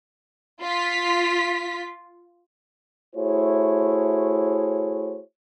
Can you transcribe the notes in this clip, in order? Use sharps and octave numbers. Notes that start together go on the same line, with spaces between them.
F4 B6
A3 E4 F#4 G#4 C5 C#5